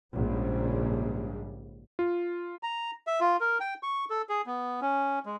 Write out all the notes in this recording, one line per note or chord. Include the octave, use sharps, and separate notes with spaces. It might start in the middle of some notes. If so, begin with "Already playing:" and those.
A#1 G#2 C#3 G3
F4
A#5
E5
F4
A#4
G5
C#6
A4
G#4
B3
C#4
G#3